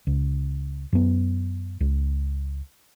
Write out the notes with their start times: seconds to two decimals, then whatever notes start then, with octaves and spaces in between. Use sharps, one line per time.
0.07 C#2
0.93 F#2 B3
1.80 C#2